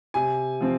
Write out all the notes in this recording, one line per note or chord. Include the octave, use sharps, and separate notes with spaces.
C3 G#5
F3 C4